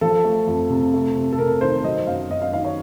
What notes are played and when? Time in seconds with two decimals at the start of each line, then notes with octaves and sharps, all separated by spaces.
0.01 F3 A4
0.25 A3
0.47 F2
0.70 C3
0.94 A3
1.16 C3
1.33 A4
1.39 C3 A#4
1.61 D#3 C5
1.84 F#3 D#5
2.07 F#2 F5
2.30 F#2 D#5
2.42 F5
2.53 D#3 F5
2.65 C#5